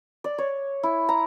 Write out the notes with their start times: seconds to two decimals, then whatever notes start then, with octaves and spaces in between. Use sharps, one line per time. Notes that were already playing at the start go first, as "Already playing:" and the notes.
0.24 D5
0.38 C#5
0.83 E4
1.09 A#5